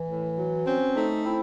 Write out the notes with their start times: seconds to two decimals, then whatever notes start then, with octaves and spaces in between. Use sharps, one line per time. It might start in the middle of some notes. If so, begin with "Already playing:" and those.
Already playing: E3
0.08 A2
0.37 F#3
0.67 C4 C#4
0.96 A3 D#4
1.25 C4 E4